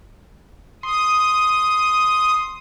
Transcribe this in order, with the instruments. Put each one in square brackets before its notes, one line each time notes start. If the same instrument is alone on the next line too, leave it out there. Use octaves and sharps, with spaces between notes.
[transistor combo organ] C6 [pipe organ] D#6